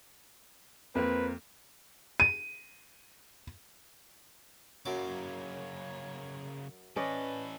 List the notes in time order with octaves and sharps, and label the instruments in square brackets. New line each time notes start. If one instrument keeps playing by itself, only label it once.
[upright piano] F2 A#3 C4 [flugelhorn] B4
[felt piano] D#7
[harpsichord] F#2 F#3 D6 [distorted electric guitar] C#3 A#3 [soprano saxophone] C#5
[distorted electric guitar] E3 A4 [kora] C#4 D5 D#5 [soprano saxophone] B4